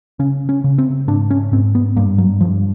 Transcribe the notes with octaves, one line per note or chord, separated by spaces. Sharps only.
C#3 C#4
C#4
C#3
C4
G#2 D4
C#4
G#2 C4
B3
G2 A#3
F#3
G2 F3